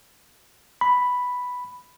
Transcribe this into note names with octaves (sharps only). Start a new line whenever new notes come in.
B5